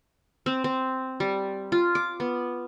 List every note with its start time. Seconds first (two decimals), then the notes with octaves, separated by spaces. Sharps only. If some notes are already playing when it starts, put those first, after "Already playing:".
0.46 C4
0.64 C4
1.20 G3
1.72 F4
1.95 D6
2.20 B3